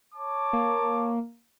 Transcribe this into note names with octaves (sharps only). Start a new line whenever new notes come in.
C#5 A5 D6
A#3